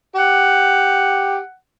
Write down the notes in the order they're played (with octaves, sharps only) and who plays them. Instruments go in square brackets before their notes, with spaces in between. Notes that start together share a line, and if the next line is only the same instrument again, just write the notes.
[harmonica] G4 [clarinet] F#5